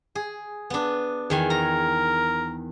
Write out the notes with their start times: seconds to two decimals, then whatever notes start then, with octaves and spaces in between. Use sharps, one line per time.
0.15 G#4
0.70 B3 D4
1.30 E2 D#3 G#5
1.50 A#4 A#5